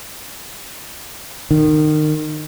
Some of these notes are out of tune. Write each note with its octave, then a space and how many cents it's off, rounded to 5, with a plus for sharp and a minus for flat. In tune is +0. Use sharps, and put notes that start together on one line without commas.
D#3 -25